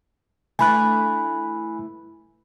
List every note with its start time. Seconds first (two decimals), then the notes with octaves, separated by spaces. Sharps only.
0.59 E3 A3 D4 G#5 B5 F#6